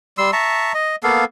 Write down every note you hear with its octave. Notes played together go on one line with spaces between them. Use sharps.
G3 C6 E6
E5 A5 A#5 C#6
D#5
A#3 B3 A4 F5